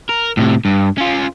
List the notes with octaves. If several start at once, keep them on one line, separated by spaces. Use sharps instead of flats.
A#4
A2 C3
G2
C#4 F4